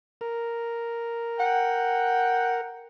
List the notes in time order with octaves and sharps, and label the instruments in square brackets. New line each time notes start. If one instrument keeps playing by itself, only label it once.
[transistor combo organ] A#4
[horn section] F#5 G5